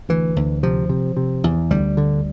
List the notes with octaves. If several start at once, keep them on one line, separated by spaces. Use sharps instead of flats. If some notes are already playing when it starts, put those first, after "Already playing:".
D2 E3
D2
C3 F3
C3
C3
E2
D2 G3
D3